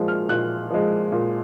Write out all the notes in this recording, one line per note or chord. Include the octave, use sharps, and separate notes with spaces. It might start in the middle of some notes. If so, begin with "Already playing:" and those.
Already playing: A#2 F3 G#3
F6
A#2 F#6
F3 G#3
A#2